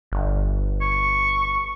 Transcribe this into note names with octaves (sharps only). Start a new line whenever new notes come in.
G1
C#6